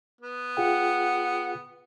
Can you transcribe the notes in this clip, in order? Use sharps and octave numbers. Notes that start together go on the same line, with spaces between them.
B3
F4 G#4 F#5 G5